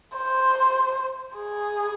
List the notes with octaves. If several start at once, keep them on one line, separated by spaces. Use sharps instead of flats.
C5
G#4